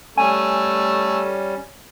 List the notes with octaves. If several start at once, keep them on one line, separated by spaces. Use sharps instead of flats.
G3 A3 C#4 G#5